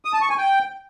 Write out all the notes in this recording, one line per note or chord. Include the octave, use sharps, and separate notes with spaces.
D#6
A5
C#6
G#5
G5